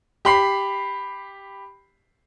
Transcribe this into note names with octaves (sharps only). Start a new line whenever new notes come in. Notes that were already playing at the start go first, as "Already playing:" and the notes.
G4 B5 C7